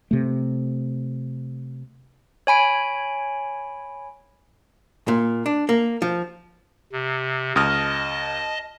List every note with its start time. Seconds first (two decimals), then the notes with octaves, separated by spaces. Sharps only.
0.11 C3 A3
2.47 C#5 G#5 B5 D7
5.08 A#2
5.46 D4
5.69 A#3
6.02 F3
6.93 C3
7.56 C#2 D#5 A5 D#6 F6